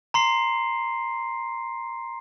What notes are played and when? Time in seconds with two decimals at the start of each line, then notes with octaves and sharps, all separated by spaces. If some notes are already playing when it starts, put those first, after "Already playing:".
0.14 A#5 C6 C7